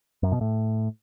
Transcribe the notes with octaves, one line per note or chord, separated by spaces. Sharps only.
F#2
B2
A2